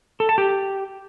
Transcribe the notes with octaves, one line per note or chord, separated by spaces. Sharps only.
A4
A5
G4